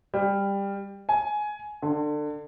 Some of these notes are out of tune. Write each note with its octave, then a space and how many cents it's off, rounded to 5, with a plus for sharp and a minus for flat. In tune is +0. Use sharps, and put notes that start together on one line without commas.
G3 +15
G#5 +15
D3 +25